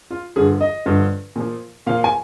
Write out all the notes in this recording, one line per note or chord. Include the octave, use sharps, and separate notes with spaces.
F4
G2 D3 F3 G#4
D#5
G2 D3 F3
A#2 F3
A#2 F3 F5
G#5